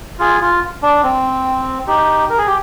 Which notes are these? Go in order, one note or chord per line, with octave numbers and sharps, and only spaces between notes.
F4 G#4
F4
D4
C4
D#4 G4
A#4
G#4
G4